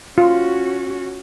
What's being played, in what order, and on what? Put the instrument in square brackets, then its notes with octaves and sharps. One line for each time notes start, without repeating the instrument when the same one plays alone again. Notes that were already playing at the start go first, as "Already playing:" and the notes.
[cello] C#4 F#4 [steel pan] F4